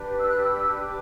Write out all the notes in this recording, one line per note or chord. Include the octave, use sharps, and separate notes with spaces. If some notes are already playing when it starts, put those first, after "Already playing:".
Already playing: D4 G4 B4
E6
F#6
E6
D6